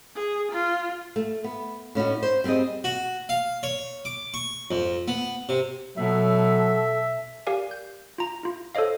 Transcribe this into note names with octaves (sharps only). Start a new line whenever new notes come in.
G#4
F4
A3
B3
A2 C#4 D#4 F#4
C5
G3 C4 G4 G#4 D#5
F#4
F5
C#5
D6
C#6
F2
B3
C3
B2 F#3 A4 E5
G4 A#4 D5 F5 G#5
G6
F4 A#5
E4 F4
A4 C5 C#5 D#5 F5